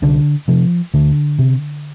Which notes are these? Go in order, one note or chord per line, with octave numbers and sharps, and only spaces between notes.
C2 D3
C3 F3
D2 D3
C3